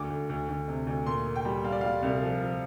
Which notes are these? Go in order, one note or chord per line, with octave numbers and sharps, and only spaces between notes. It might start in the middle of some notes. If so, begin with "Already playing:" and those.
Already playing: D2 D3 D6
D2
D2
D2
C3
D2
A#2 C6
A#2
G5
G3
G3 F5
D5
G3 F5
C2
F3
F3